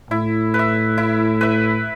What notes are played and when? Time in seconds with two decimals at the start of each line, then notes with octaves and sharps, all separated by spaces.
0.11 A2 E4
0.54 B4
0.59 E5
0.98 E4
1.41 B4 E5